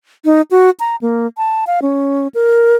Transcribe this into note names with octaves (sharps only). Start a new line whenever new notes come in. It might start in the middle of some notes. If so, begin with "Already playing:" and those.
D#4
F#4
A#5
A#3
A5
F5
C#4
A#4